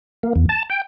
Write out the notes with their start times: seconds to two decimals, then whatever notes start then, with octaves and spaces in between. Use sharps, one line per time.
0.23 A#3
0.36 E2
0.49 A5
0.70 G5